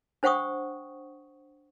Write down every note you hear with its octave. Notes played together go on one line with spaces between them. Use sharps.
D4 C5 F#5 G5 C#6 D#6